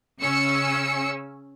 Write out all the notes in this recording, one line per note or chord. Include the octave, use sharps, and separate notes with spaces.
C#3 C#4 E6 C#7